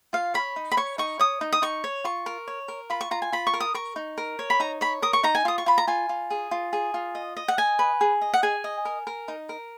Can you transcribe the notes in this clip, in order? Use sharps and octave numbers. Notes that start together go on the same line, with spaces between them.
F4 F5
C#5 B5
D#4
B5
C#5 C#6
D#4 C#6
C#5 D#6
D#4
D#6
D#4 C#6
C#5
F4 C#6
A#4
C#5
A#4
F4 B5
C#6
F4 A#5
G#5
F4 B5
C#6
A#4
D#6
A#4 C#6
D#4
A#4
C#5
B5
D#4 A#5
C#5 B5
A#4 D#6
C#6
D#4 A#5
G#5
F4 D#6
C#6
F4 B5
A#5
F4 G#5
F4
G#4
F4
G#4
F4
D#5
D#5
F#5
D#5 G#5
B4
G#4
D#5
F#5
G#4 G#5
D#5
A#4
A#4
D#4
A#4